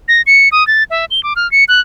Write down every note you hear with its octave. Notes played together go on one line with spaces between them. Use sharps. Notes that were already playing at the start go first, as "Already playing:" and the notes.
A#6
C#7
D#6
A6
E5
G7
D6
F6
C#7
F#6